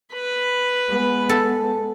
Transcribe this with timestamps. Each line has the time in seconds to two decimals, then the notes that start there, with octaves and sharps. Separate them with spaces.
0.14 B4 B5
0.90 G#3 B3
1.29 A4